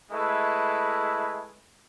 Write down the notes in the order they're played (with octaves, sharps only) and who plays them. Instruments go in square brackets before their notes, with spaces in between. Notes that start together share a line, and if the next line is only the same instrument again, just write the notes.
[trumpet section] G#3 A3 E4 B4